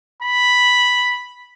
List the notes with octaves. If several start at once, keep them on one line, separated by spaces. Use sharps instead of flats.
B5